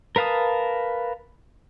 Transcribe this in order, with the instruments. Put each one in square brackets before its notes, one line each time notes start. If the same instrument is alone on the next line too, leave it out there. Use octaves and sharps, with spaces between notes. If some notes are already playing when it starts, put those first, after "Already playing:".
[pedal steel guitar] A#4 B4 F5 A5 D#6